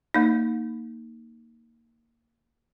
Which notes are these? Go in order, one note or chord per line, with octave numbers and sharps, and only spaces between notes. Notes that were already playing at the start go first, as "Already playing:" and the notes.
A#3 D#4